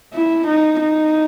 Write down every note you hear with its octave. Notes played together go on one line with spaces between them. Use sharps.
E4
D#4
D#4